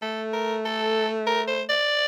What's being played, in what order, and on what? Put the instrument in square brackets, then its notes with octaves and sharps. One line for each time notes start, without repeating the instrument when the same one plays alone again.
[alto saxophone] A3 [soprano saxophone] A4
[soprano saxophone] A#4
A4
A#4
C5
D5